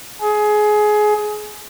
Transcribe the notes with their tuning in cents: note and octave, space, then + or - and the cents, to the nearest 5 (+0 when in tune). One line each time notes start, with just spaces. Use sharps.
G#4 +20